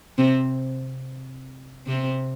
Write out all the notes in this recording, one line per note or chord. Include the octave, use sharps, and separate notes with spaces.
C3 C4
C3 C4